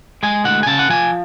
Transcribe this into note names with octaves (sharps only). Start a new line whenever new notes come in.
G#3 G#5
D2 F#5
G#5
C#3 A5
F#5
F3 G#5